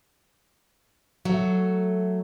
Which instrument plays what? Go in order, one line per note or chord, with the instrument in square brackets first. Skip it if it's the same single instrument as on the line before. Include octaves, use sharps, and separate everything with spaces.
[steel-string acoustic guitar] F#3 A3